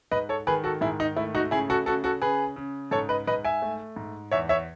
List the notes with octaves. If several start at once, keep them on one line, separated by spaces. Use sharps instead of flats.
G#2 B4 D#5
A4 C#5
D#3 G#4 B4
F#4 A4
G#2 E4 G#4
D#4
A3 E4
D#4 F#4
C#3 E4 G#4
F#4 A4
C#3 F#4 A4
F#4 A4
C#3 G#4 B4
C#3
G#2 A4 C#5
B4 D#5
G#2 B4 D#5
E5 G#5
A3
G#2
E2 C#5 E5
C#5 E5